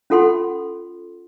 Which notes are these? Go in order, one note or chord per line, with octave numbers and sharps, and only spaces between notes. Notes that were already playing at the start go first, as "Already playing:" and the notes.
C#4 F4 A4 F#5 C6